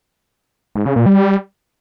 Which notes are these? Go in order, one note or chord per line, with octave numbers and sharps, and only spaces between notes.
G#2
C#3
A#2
G3